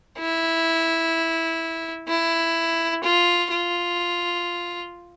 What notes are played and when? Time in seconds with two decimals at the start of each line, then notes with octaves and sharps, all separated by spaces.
0.19 E4
2.08 E4
3.03 F4
3.51 F4